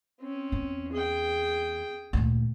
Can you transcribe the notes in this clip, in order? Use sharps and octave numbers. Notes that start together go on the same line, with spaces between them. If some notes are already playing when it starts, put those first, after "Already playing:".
C4 C#4
E2
G#4 G5
D2 A#2